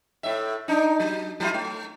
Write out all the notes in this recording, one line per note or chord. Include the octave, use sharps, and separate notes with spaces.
A2 E5
D4 D#4
F#3
F#3 E4 F4
A3